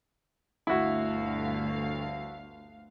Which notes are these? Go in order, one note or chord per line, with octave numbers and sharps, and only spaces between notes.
G1 D2 E4 F#4 F5